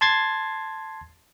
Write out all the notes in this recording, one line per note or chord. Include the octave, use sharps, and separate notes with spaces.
A5 C6 G#6 A6 C7